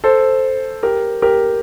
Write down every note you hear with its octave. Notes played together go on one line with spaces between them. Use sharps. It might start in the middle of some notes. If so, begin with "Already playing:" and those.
A4 C5
G4 A#4
G4 A#4